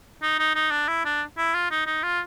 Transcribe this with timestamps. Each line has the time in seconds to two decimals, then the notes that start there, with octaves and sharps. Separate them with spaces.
0.22 D#4
0.39 D#4
0.55 D#4
0.71 D4
0.88 E4
1.05 D4
1.38 E4
1.54 F4
1.71 D#4
1.86 D#4
2.03 F4